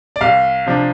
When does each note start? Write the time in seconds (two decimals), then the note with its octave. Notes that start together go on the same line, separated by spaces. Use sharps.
0.16 D5
0.21 C2 F5
0.66 C3 F3 D4